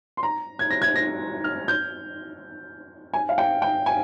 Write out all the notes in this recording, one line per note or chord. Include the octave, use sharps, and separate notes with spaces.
C6
A#5
G#6
A#6
G#6
A#6
F6
G6
G#5
F5
G5
G5
G#5